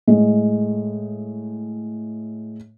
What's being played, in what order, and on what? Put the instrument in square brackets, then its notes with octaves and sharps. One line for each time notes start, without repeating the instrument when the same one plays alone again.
[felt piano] A2 G#3